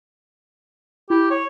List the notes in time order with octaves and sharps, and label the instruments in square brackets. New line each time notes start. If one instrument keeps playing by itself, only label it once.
[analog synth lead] E4 [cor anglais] G4
[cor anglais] C#5